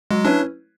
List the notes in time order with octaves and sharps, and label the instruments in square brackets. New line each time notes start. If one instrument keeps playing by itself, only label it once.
[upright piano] F#3 [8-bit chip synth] G#3
[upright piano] C#4 E4 B4 [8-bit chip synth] D4